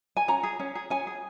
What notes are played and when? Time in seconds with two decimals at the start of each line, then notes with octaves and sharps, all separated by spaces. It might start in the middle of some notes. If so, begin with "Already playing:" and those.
0.17 G#5
0.28 C#4 A#5
0.43 G#4
0.60 C#4
0.75 G#4
0.90 C#4 G#5
1.07 G#4